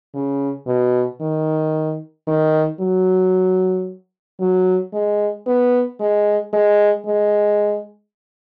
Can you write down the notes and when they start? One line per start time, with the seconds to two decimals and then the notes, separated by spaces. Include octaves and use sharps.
0.14 C#3
0.67 B2
1.21 D#3
2.27 D#3
2.80 F#3
4.40 F#3
4.93 G#3
5.46 B3
6.00 G#3
6.53 G#3
7.06 G#3